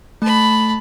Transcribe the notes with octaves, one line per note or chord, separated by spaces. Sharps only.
A3 A5 B5